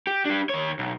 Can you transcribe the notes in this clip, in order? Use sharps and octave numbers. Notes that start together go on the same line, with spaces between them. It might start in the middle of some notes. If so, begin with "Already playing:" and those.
G4
D4 G4
D#2 C#5
B1